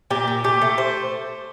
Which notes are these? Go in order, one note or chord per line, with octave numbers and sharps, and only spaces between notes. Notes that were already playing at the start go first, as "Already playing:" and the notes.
A#2 G4
A#2
A3 G4
A3
A3 C5